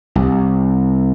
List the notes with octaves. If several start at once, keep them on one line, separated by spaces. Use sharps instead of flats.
C2